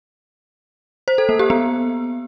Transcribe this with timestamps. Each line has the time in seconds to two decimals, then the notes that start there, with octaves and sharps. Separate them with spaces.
1.08 C5
1.18 A4
1.29 A#3
1.39 G4
1.50 B3